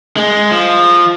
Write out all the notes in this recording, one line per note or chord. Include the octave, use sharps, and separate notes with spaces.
G#3
F3